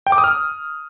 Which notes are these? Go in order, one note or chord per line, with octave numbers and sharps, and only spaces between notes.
G5
D6
D#6
F6